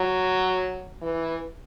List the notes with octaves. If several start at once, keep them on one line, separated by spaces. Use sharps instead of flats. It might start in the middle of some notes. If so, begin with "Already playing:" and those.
Already playing: F#3
E3